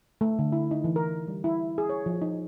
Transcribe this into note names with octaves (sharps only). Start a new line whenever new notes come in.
A3
D3
E4
D#4
E3
A#4
G3
E4
G#4
C#5
F3
D#4